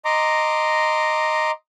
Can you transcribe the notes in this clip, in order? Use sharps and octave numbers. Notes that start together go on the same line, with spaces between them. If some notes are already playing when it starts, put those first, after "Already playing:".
D#5 A#5 C6 D6